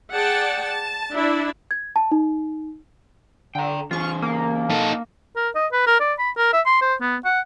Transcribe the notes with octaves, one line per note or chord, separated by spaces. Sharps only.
G#4 D5 F#5 G5 A5
A5
D4 E4 D5 E5
G#6
A5
D#4
D3 G5 A#5
E3 C#4 F4 G#4 C#6
A#3
D#4 A4
A#4
D#5
B4
A#4
D5
B5
A#4
E5
C6
C5
B3
F#5